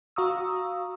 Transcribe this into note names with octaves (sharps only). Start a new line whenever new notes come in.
F#4 F5 A#5 C#6 D#6 E6